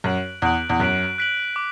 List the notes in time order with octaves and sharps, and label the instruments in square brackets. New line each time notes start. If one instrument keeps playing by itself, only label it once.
[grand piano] F#2 [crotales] F#6 B6 D7 F#7
[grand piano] E2 [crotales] F#6 B6 D7 F#7
[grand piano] E2
[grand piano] F#2 [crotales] F#6 B6 D7 F#7
[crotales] F#6 B6 D7 F#7
D6